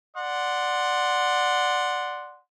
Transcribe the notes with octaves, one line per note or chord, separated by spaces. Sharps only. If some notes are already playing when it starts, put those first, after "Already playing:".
D5 F#5 C6